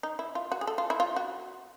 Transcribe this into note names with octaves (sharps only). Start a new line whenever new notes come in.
D#4
E4
F4
F#4
G#4
A4
F4
E4
F4
F#4